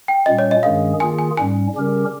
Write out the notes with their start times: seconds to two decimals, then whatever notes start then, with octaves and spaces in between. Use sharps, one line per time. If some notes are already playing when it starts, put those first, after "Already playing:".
0.08 G5
0.26 A#2 G3 C#4 D#5
0.39 C#5
0.51 D#5
0.63 G2 D#3 G#3 C#4 G#4 F5
1.00 D#3 A#3 F4 G#4 G#5
1.19 G#5
1.37 G#2 G3 C#4 G#5
1.75 C#3 G3 C#4 G4 A#4